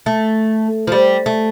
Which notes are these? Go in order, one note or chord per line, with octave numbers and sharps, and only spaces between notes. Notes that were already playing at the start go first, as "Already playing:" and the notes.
A3
F3
G3
A3